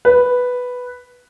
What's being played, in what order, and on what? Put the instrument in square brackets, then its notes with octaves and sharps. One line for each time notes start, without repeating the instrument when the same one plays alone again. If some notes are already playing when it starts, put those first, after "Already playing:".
[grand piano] B4